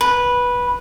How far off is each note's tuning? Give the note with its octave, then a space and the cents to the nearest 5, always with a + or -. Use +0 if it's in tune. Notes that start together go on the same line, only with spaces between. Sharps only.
B4 -10